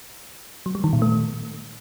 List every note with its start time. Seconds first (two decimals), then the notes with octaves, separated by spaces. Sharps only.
0.66 F#3
0.75 G3
0.84 D#3
0.93 A#2
1.02 A3